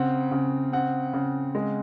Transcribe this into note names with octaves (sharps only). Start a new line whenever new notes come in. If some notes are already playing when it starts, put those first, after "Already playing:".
Already playing: C#3 C4 F#5
C#3
C4 F#5
C#3
G#3